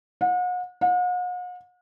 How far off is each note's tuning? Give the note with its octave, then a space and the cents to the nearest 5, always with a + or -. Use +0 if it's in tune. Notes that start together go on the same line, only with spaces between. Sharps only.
F#5 -40
F#5 -45